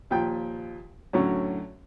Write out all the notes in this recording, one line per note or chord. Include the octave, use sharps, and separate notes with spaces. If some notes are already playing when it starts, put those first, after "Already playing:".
D#2 A#2 F3 G5
F#2 A2 D3 F#3 C#4